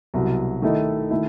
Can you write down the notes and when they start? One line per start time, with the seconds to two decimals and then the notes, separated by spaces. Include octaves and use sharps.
0.14 C2 B2 F#3
0.62 D#3 A3 E4 A4 D#5
1.11 D#3 A3 E4